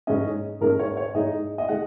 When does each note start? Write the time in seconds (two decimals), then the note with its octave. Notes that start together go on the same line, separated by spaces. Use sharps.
0.07 G#2 G#3 C#4 D#5
0.61 G#2 G#3 C#4 A#4
0.79 C#5
0.97 C#5
1.14 G#2 G#3 D#4 D#5
1.58 D#5
1.69 G#3 F#5